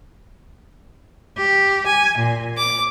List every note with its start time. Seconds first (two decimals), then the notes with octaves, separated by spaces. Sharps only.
1.38 G4
1.87 G#5
2.18 A#2
2.58 D6